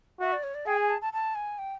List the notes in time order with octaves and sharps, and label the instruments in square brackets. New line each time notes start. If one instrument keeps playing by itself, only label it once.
[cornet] F#4 [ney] E5
[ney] D5
C#5
D5
[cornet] G#4 [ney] G5
[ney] G#5
A5
A5
A5
G#5
G5